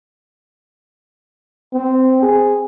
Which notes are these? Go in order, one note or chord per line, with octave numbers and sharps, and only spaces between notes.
C4
G#4